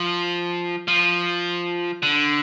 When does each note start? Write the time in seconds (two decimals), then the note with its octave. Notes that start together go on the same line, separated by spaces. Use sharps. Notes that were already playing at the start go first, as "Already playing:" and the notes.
Already playing: F3
0.88 F3
2.03 D3